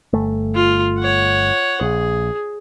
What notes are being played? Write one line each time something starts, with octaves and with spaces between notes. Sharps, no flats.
G1 A3
F4
C#5 F#5
A#1 G#4